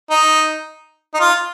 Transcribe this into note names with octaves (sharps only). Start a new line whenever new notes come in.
D#4
D#4
F4